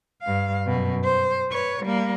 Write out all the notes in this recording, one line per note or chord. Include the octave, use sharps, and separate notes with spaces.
G2 F5
F#2 B2
C5
B4 C#5
G3 A#3